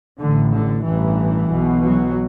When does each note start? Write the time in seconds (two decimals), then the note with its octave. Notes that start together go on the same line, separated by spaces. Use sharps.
0.19 A1 A2 D3
0.51 D3
0.84 A1 G2 E3
1.50 B1 B2
1.83 F#3